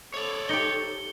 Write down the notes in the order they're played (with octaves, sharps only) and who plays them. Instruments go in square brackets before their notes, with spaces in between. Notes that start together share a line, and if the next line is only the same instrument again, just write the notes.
[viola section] A4 [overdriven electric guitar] C#5 D5
[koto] D#4 G4 [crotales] C#7 G7